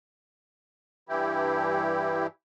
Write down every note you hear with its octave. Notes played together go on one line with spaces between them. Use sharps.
G2 E3 E4 G4